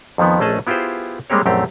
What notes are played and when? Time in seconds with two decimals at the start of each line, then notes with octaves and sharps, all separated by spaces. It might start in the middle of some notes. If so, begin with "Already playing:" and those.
0.18 F2 D#3 F3 B3
0.40 A#1 A3 C#4 G#4 D#5 A5
0.67 B3 E4 F4 G4 G#4 C5
1.30 G3 G#3 A#3 C4 G4 C#5
1.46 A#1 F#2 A3 C4 G4